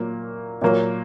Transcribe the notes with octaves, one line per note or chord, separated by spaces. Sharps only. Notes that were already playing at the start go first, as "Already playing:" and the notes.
Already playing: A#2 F#3 A#3
A#2 F#3 A#3